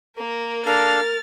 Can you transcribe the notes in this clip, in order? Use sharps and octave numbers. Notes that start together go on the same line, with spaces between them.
A#3 A#4
D4 A4 A#4 F5 F6 A6